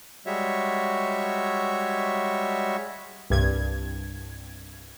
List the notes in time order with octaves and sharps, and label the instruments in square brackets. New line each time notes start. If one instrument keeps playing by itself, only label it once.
[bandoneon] G3 G#3 F#4 C#5 E5
[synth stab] C2 G2 G#6